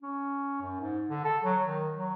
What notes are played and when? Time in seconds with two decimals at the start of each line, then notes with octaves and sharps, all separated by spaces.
0.03 C#4
0.62 F#2
0.80 G#2
1.10 D3
1.25 A4
1.44 F#3
1.63 D#3
1.97 F#3